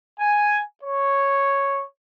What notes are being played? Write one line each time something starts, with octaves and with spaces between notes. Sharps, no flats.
G#5
C#5